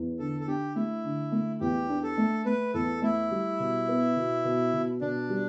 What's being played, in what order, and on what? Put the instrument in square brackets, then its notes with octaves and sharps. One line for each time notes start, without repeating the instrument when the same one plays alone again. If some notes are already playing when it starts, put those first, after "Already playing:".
Already playing: [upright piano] E2
[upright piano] D3 [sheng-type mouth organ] A4
[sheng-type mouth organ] A4
[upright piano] D4 [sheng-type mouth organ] G4
[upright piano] A3 [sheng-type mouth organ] E4
[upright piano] D3
A3
[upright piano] E2 [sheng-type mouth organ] G4
[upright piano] D4
[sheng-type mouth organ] A4
[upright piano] A3
[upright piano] A3 [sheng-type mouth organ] B4
[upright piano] E2 [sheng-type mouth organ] A4
[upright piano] A3 [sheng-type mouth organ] E4
[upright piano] G3
B2
B3
B2
B2
B2
[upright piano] B2 [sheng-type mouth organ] D4
[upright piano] G3